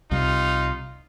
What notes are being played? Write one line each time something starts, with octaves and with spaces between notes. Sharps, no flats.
C2 C3 G3 D#4 F4